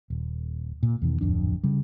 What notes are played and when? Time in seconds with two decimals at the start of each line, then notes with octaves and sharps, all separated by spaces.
0.10 D#1
0.83 A#2
1.02 E2 B2 D#3
1.21 D1 G#1 F2 D4
1.64 C#3 G3